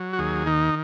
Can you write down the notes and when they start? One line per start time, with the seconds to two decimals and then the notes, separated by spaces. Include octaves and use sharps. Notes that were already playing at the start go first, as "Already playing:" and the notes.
Already playing: F#3
0.13 F#4
0.19 D#2 G#4
0.46 D#3 D#4